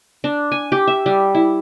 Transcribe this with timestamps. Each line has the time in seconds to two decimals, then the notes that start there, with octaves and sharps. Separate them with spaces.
0.24 D4
0.52 G#5
0.72 G4
0.87 E5
1.06 G3
1.35 E4